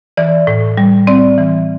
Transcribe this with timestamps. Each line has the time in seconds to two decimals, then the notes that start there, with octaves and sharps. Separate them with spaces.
0.17 E3 D5
0.47 A2
0.77 G3
1.07 C4 D5
1.38 E3